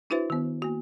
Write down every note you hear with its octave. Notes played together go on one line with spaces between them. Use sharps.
D4 E4 F#4 B4 C5 E5
D#3 B3
A#3 F#4